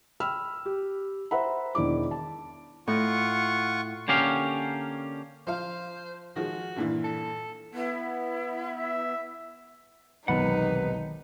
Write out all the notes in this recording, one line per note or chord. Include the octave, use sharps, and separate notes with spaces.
G5 B5 E6 F6
G4
C5 E5 F#5 A#5 B5
E1 D#3 D4 E4 D6
A5
A2 F4 F#5 C#6
D3 A#3 C#4 G4 F5
F3 C5 F5
D#3 F3 G#3 F#4
G2 A#2 E3
A4
B3 E4
E5
E1 B1 C3 D#3 D#4 B4 F#5 B5